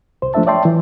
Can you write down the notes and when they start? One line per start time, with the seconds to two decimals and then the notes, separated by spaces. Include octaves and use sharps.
0.22 C2 C5
0.34 F3 A3 D4 C5 E5 A5
0.47 C#5 D5 E5 G5 A5 C6
0.65 E3